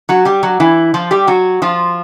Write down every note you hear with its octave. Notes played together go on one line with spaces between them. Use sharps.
F#3 F#4
G3 G4
F#3 F#4
E3 E4
F3 F4
G3 G4
F#3 F#4
F3 F4